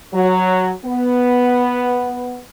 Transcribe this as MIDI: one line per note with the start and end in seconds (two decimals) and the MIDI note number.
0.13 0.70 54
0.85 2.40 59